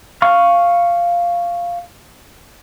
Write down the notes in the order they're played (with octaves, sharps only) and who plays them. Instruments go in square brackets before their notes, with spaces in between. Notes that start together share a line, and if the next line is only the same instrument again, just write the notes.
[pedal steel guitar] F5 C#6 F6